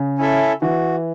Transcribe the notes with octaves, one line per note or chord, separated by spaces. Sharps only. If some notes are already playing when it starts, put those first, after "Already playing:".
Already playing: C#3
C#4 E4 A4 E5
E3 F#4